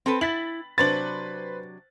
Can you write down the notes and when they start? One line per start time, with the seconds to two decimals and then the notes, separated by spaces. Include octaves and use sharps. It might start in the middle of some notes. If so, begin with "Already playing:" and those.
0.06 C4 A4 B4
0.21 E4 A6 B6 F#7
0.78 C3 F#3 D4 B4 C5 A6 F#7